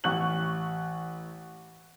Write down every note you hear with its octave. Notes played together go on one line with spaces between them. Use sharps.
A1 C#6 F#6 F#7